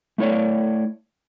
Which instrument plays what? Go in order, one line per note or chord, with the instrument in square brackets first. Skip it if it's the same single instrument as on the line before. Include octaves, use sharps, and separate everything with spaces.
[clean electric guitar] A3 E4 C#5 D5